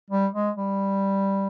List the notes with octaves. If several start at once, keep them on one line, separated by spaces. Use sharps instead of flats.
G3
G#3
G3